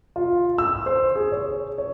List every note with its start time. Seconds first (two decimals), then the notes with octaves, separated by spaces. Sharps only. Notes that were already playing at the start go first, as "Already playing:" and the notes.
0.16 F4
0.58 E6
0.86 C5
1.15 G#4
1.32 C#5
1.78 C#5